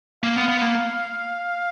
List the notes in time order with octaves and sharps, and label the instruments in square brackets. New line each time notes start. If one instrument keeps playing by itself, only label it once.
[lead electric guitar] A#3 [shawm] F5
[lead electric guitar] B3
B3
A#3